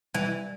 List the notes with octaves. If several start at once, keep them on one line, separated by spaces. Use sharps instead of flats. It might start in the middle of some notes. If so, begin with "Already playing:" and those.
E3 G3